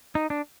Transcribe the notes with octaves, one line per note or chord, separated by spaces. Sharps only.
D#4
D4